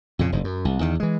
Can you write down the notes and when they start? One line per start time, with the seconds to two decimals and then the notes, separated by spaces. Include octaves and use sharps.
0.19 F2 A#2 C#3
0.32 F#1 G#2
0.44 F#2
0.65 C2
0.81 E2 D#3
1.00 E3 G#3